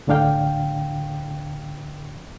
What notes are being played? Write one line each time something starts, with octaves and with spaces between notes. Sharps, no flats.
C#2 A2 D3 D4 F5 G5